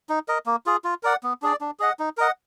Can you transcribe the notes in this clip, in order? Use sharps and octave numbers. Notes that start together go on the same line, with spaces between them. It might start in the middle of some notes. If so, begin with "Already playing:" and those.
D#4
A#4 D#5
A#3
F4 G#4
F4
A#4 D5 F#5
B3
D4 G#4 D5
D4
G#4 D#5 F#5
D#4
A#4 D#5 F#5